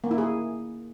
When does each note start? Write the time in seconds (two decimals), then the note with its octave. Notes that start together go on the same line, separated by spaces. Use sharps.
0.04 A#3
0.11 E4
0.18 G#4